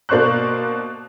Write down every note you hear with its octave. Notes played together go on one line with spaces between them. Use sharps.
B2 A#3 D4 C5 C#6 F#6